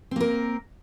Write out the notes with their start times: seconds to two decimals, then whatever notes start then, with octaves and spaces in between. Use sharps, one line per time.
0.11 C4
0.16 A#3
0.21 A#4